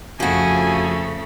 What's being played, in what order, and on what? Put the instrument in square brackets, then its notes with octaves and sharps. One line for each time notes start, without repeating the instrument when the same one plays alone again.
[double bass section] F2 [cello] C#3 A3 [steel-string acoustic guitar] F3 F#4 [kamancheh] G#5